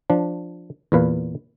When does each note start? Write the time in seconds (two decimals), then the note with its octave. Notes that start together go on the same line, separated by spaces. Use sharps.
0.10 F3 D4
0.92 E2 A#2 B4 F5